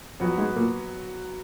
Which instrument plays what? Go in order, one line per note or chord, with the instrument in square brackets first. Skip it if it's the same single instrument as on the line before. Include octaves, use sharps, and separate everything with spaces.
[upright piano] F2 F3 [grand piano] F#3 B3 F#4 B4
[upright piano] G#2 G#3
A#2 A#3